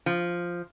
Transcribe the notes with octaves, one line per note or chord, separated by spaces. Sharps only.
F3